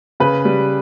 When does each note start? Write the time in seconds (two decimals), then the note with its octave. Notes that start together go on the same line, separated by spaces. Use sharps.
0.20 C#3 B4
0.45 G3